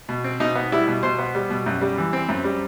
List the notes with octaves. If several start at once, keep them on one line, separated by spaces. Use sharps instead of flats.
B2
C4
B2 D#4
B3
G3 E4
B2
B2 C5
B3
G3
B2
F#2
G3
E3
C4
F#2
G3